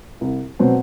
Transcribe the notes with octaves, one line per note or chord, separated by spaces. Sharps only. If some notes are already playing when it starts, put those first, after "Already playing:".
C2
B2 F#3 C4